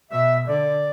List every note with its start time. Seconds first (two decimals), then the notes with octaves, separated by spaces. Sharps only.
0.11 B2 E5
0.47 D3 D5